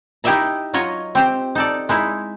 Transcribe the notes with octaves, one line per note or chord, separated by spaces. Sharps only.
D#4 E4 G4 D#5 E5 A#5
F#3 F4 C#5 D#5 A#5
C4 G4 C5
D#4 A4 D5
G#3 D#4 E4